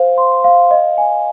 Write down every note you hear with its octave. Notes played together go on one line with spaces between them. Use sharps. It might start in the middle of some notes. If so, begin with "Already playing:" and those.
Already playing: C5 F5
C6
F5
D#5
G#5